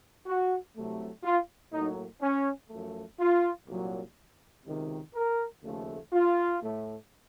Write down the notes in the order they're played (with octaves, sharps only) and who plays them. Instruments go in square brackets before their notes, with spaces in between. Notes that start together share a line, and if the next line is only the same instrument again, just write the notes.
[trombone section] F#4
C2 C3 F#3 A3
F4
A2 F#3 A#3 D#4
C#4
F#2 F3 A3
F4
C2 A#2 F#3
C#2 C3 D#3
A#4
D#2 C#3 F3 A3
F4
A2 A3